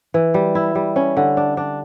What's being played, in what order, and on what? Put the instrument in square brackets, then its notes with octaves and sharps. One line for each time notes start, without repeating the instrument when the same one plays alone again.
[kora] E3
G3
E4
G3
C#4
D3
D4
D4